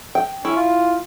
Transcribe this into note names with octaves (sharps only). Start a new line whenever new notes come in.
G5
C#4 E4
F4